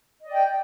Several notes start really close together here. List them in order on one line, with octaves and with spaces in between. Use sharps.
D#5 D5 G5